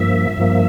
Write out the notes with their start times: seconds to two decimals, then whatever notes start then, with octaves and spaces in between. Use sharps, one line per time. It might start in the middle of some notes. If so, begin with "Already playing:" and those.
Already playing: G2 F3 A#3 E5
0.37 G2 F3 A#3